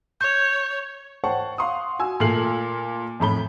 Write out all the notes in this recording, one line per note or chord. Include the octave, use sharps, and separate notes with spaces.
C#5 G6
C5 C#5 F#5 G5 A5 C#6
F5 F#5 C6 C#6 D#6
F#4 G#5 E6
A#2 A3 F6 C7 F#7
F2 A2 B5 G7